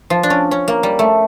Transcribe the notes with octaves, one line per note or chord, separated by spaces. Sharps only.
F3
D4
C#4
C#4
A#3
G3
A3